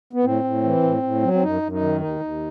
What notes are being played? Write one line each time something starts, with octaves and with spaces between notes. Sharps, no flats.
B3
A2 C4
A2
E3
A2
A2
F#3
C4
F#2 D#4
F#2
D#4
D#3
D#2 D#4
D#2